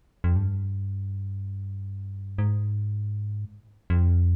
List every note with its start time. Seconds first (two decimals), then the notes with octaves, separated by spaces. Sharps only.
0.24 F2
0.36 G2
2.38 G#2
3.90 F2